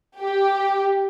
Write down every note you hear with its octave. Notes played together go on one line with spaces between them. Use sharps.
G4